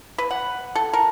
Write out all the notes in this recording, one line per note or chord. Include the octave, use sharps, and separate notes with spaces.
B4
F#5
A4
A#4